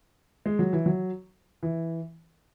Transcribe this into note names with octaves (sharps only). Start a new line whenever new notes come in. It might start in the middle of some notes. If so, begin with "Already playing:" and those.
G#3
F#3
E3
F#3
E3